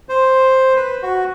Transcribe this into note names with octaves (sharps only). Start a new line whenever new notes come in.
C5
B4
F#4